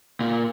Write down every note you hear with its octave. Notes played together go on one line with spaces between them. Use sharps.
A#2